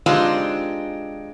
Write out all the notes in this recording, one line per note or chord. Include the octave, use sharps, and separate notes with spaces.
G#3 C4 D4 D#4 F4 G4